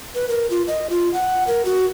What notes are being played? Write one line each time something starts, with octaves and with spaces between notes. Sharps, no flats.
B4
A#4
F4
D#5
F4
F#5
A#4
F#4